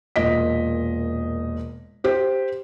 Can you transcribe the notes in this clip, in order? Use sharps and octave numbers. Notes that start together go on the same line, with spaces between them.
E1 A#2 D#5 B6
G4 C5